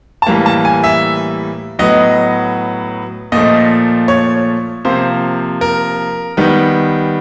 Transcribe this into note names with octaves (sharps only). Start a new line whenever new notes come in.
A5
A2 E3 G3 A#3 A#5
A5
G#5
E5
A2 F#3 B3 D#5
A#2 F3 A3 D#5
C#5
C3 F3 A#3 C5
A#4
D#3 G3 B3